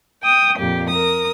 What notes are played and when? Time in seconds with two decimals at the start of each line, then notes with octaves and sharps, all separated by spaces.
0.23 G5 D#6
0.58 F2 A#2 G4
0.89 A#4 D#6